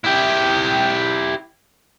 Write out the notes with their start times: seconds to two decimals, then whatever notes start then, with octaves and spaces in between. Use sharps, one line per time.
0.05 E4 G4